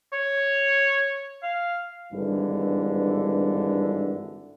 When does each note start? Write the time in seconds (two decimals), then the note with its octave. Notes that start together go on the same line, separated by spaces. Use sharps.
0.13 C#5
1.43 F5
2.12 G#1 G2 D3 E3